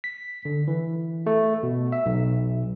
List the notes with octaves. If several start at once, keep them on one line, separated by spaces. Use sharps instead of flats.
B6
D3
E3
A3
B2
E5
B1